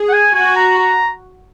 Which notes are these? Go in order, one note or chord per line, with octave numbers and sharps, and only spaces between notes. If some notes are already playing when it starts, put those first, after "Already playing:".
Already playing: G#4
F#5
G#5
F#4 G#5
A#5
A#5